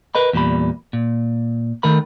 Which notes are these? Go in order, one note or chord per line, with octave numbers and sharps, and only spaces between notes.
A#4 B4 D#5 B5
E2 A#2 G3 B5
A#2
D#3 A3 A#4 B5